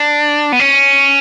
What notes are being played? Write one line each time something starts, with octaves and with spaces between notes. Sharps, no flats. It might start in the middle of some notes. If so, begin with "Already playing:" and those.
Already playing: D4
B3
C#4